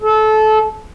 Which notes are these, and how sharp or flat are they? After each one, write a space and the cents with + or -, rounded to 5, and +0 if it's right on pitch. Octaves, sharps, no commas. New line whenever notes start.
A4 -25